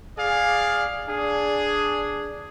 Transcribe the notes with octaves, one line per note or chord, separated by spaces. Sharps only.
G#4 D5 F5
D4 G#4